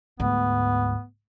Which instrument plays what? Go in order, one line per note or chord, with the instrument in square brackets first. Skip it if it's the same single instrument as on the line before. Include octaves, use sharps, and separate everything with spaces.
[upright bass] D2 G#2 [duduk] B3